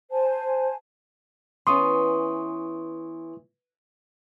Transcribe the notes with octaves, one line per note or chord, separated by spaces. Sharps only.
C5 G#5 A5
E3 B3 C#4 C6 C#6 D#6